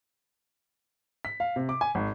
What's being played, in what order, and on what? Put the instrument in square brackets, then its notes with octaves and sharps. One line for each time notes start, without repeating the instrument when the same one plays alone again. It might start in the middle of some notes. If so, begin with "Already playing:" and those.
[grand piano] B6
F5
C3
D6
G#5
G#1